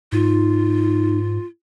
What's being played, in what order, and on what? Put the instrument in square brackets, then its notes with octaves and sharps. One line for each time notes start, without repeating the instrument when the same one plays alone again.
[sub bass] G#2 [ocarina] D#4 [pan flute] F4